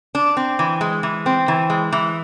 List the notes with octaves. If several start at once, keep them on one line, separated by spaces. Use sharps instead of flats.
D4
C4
E3
G#3
E3
C4
E3
G#3
E3